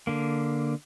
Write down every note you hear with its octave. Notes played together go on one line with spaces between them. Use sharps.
D3 A#3